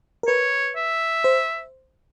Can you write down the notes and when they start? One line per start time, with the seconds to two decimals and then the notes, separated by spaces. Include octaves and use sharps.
0.23 A#4
0.27 B4 C#5
0.76 E5
1.24 C5